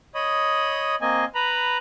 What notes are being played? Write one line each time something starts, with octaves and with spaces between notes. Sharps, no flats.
C#5 D#5 B5 D#6
A#3 C4 D#5 G#5
B4 A#5 B5